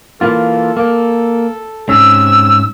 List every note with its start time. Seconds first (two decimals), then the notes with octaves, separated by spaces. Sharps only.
0.21 E3 A#3 F4 A4
0.77 A#3
1.89 G#2 C3 C#4 E6